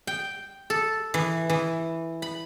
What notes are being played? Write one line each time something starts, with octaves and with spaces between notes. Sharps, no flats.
G5
A4
E3
E3
B5